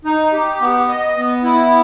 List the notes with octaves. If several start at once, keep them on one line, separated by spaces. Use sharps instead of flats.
D#4
G4
B3
D#5
B3
E4